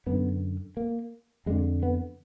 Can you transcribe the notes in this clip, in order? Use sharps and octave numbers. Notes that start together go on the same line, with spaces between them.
F#2 D3 B3
A#3
F2 D3 G#3
B3